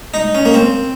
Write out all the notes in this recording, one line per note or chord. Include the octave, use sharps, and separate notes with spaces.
D#4
C#4
A#3
C4